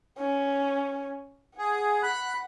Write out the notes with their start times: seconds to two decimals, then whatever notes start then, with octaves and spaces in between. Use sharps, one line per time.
0.18 C#4
1.58 G#4 F#5
2.03 B5 F#6